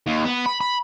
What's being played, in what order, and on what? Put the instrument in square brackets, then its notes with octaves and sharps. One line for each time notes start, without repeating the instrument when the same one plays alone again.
[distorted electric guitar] D#2
B3
B5
B5